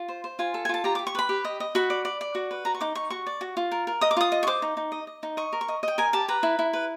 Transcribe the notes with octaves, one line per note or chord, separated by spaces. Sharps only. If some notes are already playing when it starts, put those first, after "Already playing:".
Already playing: F4
C5
C5
F4 G#5
A4
G#5
F4 A5
G4 A#5
D6
G4
C#6
B4 B5
G4
D#5
D#5
F#4 B5
D5
D5
D5
F#4
B4
F#4 A#5
C#6
D#4 D6
D#4 C#6
F#4 C#6
D5
F#4
F4
A#4
A#4
D#5 D#6
D6
F4 D#6
D#5
C#6
C5 D6
D#4
D#4
D#5
D#5
D#4
D#5 C#6
A#4
C#6
D#5
D#5 G5
A#4 G#5
G4 A5
B4 A#5
E4
E4
B4